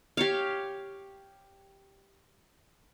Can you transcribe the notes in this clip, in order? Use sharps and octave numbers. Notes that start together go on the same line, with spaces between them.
G4 C#5 F5